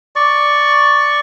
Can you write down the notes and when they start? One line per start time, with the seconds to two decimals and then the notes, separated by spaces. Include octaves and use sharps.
0.16 D5 C#6